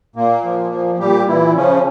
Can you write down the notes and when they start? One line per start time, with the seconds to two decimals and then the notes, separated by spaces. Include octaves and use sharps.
0.16 A#2 A#3
0.44 F3
0.72 F3
1.00 A#2 G3 G4
1.27 A#2 E3 E4
1.55 C#3 F3 C#4